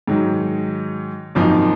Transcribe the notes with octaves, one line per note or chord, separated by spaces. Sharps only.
G#2 D#3 F#3
G#1 F#2 F3 A#3 D#4